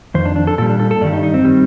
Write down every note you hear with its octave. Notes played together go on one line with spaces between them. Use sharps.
F2 D#3 C5
D4
D4
A4
A#2 G3 A4
D4
A4
A4
G2 D#3 G3 D5
D#4
D#4
C4
D#3 G3